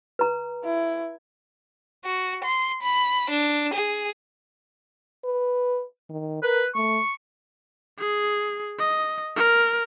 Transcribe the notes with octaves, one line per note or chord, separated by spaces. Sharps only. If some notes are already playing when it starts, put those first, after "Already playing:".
B4 A#5
E4
F#4
C6
B5
D4
G#4
B4
D#3
A#4 B4
A3 C#6
G#4
D#5
A#4